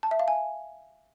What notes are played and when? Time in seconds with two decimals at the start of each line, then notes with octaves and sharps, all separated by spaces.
0.03 A5
0.11 E5
0.19 F5
0.28 G#5